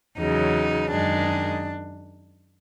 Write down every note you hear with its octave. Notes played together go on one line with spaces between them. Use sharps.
E2 C#3 F#3 D#4
F#2 D#3 G#3 D4